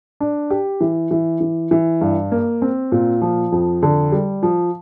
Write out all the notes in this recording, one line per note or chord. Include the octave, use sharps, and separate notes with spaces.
D4
G4
E3
E3
E3
E3
G2
A#3
C4
A#2
F3
F2
D3
G3
F3